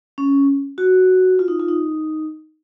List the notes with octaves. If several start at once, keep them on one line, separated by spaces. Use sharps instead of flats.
C#4
F#4
F4
D#4
F4
D#4